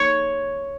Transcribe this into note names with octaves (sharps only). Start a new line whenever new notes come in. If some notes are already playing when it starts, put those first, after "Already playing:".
Already playing: C#5